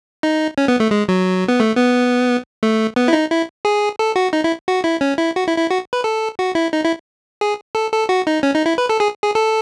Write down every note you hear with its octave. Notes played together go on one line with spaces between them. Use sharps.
D#4
C#4
B3
A3
G#3
F#3
B3
A3
B3
A3
B3
E4
D#4
E4
G#4
A4
F#4
D#4
E4
F#4
E4
C#4
E4
F#4
E4
E4
F#4
B4
A4
F#4
E4
D#4
E4
G#4
A4
A4
F#4
D#4
C#4
D#4
E4
B4
A4
G#4
G#4
A4